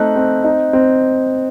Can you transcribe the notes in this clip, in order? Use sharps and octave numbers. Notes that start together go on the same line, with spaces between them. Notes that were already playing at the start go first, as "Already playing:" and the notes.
Already playing: A3 C4 D#4 F#6
C4
D#4
C4